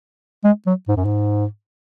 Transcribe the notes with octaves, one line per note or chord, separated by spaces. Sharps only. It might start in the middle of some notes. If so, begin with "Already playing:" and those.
G#3
F#3
G#2
F#2
G#2